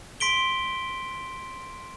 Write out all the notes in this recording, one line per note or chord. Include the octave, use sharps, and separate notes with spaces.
C6 B6 D7 G7